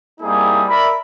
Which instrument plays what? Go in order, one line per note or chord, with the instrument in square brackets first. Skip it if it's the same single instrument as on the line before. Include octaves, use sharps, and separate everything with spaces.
[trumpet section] G3 A#3 C4 D#4 E4 G#4
A#4 D5 E5 B5